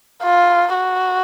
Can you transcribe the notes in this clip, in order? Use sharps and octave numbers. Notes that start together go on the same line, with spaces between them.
F4
F#4